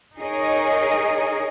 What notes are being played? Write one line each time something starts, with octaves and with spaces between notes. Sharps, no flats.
D#4 G#4 A#4 C#5 D#5